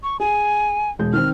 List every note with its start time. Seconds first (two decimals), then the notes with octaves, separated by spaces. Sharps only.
0.03 C#6
0.20 G#4 G#5
0.99 E1 G#3 G6
1.14 D#3 C4 F6